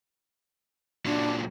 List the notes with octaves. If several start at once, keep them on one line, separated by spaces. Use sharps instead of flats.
A#2 F#3 D4